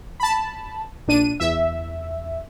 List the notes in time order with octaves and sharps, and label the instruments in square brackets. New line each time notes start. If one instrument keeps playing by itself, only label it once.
[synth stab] A5 B5
A#1 D4 D#7
E2 E5